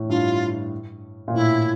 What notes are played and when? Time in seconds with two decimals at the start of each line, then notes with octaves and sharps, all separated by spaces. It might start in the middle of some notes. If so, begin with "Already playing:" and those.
Already playing: A2
0.09 G2 F4
1.28 A#2
1.34 A2 E4